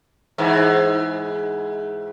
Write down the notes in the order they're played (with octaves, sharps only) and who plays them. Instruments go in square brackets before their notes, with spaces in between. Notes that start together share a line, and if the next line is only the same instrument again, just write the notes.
[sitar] G#2 E3